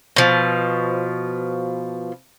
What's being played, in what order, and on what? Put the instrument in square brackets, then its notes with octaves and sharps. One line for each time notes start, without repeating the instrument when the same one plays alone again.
[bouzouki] B2 F3